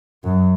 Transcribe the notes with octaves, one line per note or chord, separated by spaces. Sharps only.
F#2